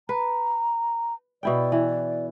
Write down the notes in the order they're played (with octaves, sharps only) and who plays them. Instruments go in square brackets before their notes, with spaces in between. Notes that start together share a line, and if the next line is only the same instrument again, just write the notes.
[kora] B4 [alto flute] A#5
[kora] B2 E4 G5 [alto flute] D5
[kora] E3